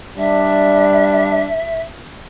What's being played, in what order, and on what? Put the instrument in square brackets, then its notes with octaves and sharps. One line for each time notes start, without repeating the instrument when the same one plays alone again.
[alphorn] G3 [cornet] D4 [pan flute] E5